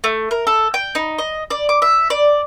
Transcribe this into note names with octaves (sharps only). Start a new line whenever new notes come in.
A3
A#4
A4
G5
D#4
D#5
D5
D6
E5
D5